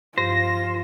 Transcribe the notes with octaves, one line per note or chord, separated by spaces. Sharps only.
G2 F3 F4 C5 A#6